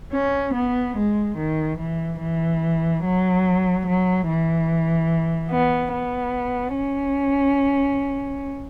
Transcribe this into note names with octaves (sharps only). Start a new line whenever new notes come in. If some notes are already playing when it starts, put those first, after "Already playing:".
C#4
B3
G#3
D#3
E3
E3
F#3
F#3
E3
B3
B3
C#4